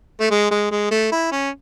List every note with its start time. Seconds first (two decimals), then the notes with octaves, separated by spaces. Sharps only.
0.20 A3
0.31 G#3
0.51 G#3
0.71 G#3
0.91 A3
1.12 E4
1.32 C#4